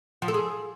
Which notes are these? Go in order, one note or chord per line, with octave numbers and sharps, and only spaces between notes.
F3
A4
G#4